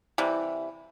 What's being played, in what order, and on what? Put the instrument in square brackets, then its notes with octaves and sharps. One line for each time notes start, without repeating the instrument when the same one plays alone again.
[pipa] C3 E3 G3